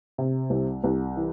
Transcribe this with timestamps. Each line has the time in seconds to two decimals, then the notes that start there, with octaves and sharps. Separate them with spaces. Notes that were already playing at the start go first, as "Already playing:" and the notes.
0.18 C3
0.50 C2
0.84 C2
1.17 E3